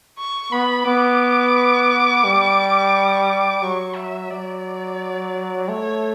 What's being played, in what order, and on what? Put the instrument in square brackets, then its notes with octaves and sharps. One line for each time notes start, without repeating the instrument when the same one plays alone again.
[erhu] C#6
[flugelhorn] B3 [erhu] B5
[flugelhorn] B3 [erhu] D6
[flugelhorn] G3
[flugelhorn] F#3 [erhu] C#6
[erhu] E5
[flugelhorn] F#3 [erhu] D5
[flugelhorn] A3 [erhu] C#5